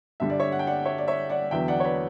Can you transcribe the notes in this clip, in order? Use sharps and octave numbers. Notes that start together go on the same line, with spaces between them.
G2 D3 G3 E5
D5
C#5 E5
F#5
G5
D5 F#5
C#5 E5
D5
C#5 E5
D5 F#5
E2 D3 F#3 B3 E5 G5
D5 F#5
C#5
B4 D5